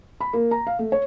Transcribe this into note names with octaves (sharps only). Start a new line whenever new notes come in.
B5
A#3
A#5
F5
A3
C#5